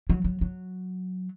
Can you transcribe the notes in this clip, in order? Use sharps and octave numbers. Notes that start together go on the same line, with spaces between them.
F#3
F#3
F#3